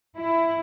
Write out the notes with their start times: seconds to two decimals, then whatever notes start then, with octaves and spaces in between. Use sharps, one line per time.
0.16 E4